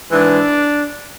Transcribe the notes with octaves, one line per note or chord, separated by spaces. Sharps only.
G#2 E3 G#3 D4